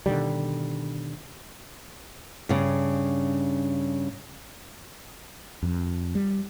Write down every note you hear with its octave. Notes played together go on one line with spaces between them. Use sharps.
B2 D3 D#3 G3
G2 C#3
F2
G3